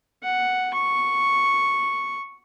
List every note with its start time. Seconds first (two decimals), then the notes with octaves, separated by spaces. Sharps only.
0.23 F#5
0.74 C#6